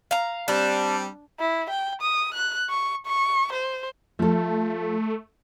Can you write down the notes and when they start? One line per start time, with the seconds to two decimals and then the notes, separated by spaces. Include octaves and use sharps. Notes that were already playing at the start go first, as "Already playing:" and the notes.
0.11 F5 A#5
0.48 G3 C4 D4
1.40 E4
1.70 G5
2.02 D#6
2.35 F#6
2.70 C#6
3.06 C#6
3.53 C5
4.19 F3 A3 A4